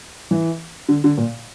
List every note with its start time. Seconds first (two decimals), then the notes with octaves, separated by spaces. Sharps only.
0.31 E3
0.89 D3
1.04 D3
1.17 A#2